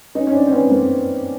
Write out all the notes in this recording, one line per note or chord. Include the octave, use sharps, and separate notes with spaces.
C#4 D#4
C#4
C4 D4
C4
B3 C#4
A#3 C4